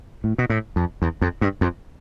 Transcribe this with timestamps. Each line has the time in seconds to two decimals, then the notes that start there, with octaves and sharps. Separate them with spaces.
0.24 A2
0.38 B2
0.50 A2
0.76 F2
1.02 E2
1.21 F2
1.41 G2
1.61 F2